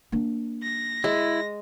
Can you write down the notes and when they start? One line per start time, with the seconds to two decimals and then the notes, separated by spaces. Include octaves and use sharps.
0.12 A#3 D4
0.63 A#6
1.04 G#3 E4